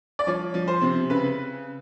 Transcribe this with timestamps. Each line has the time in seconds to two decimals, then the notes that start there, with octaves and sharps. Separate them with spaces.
0.19 D5
0.27 F3 C#5
0.54 F3
0.68 C5
0.82 C3
1.10 C#3 B4